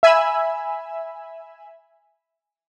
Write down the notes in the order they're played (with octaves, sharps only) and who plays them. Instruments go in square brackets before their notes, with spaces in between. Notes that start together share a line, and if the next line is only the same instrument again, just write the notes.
[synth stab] E5 G#5 B5 E6